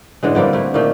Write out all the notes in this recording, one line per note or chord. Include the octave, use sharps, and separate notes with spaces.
A2 D3 E3 G#3
D3 G3 A#3 C4
A3 E4
A#2 D#3 A3